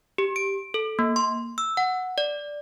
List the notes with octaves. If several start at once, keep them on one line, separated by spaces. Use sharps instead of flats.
G4
D7
A4
A#3
C6
E6
F#5
D5